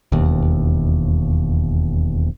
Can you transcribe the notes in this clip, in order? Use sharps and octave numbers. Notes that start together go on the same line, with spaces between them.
E1 D#2